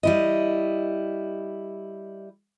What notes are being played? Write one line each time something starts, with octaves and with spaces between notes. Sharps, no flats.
G3 E4 D#5